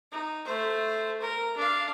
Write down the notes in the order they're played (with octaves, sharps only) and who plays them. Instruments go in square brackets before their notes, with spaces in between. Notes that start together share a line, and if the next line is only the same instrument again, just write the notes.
[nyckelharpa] D#4
A3 C5
A#4
D4 F5